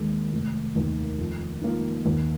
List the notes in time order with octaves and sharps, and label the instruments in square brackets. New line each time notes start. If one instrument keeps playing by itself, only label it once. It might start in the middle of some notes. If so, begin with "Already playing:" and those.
Already playing: [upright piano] D#2 D#3 G#3
F1
D#2 D#3
F2
F3 A#3 D#4
D#2